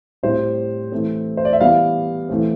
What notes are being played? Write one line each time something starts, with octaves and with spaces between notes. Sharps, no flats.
A2 G3 C4 C5
E3 A3 C4
C5
D5
E5
E3 G3 B3 F5
E3 A3 C4